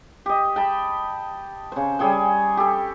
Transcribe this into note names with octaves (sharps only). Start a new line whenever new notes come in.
G4 D#5
G5 A5 B5
C#3 C5
G3 G#4 C#5 G5
G4 A4